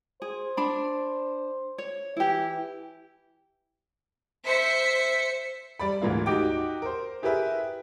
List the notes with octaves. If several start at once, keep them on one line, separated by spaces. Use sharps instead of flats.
G#4 C5
D4 B5
C#5
E3 E4 G4
C5 E5 B6 C#7
G3 D5 B5
D2 G#2 E3 A#3 F4
D#4 F#4 G4 G5 D6
A#4 C5
E4 G4 G#4 A#4 B4 E5